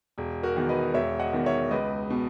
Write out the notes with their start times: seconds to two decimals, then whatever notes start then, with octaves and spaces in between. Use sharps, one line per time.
0.18 E1
0.43 F#4 A#4
0.56 E2 D#3
0.69 B4 D#5
0.94 E1 C#5 E5
1.20 D#5 F#5
1.33 E2 D#3
1.46 C#5 E5
1.71 C#2 B4 D#5
2.10 B2